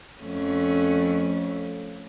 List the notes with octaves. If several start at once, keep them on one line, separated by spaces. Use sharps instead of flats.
F2 A3 C#4